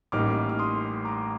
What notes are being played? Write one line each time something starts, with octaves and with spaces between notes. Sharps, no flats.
A1 A2 G3 A#3 D#4 D6 F6
F6
C6 D#6
A#5 D6